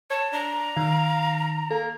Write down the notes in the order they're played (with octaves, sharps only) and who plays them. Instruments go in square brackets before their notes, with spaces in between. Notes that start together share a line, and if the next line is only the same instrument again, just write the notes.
[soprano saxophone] C#5 [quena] A5
[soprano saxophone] D4 [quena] A#5
[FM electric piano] D#3 [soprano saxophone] F5
[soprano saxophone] A#3 [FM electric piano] A4